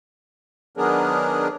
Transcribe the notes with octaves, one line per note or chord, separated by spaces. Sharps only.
D#3 F#3 B3 D4 G#4 A#4